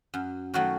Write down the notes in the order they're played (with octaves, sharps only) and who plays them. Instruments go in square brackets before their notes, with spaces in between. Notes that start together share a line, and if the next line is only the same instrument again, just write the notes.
[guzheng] F#2
D#3 F#3 A3 F#4